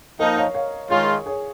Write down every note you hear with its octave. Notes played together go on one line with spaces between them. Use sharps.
F3 A#3 D#4 A#4 D#5
C#5 F5
C#5 F5
D#3 G#3 F4 G#4 C#5
G#4 C#5